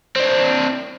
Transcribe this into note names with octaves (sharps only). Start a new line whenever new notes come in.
C4 D4